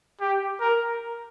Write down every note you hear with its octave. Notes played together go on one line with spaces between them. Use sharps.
G4
A#4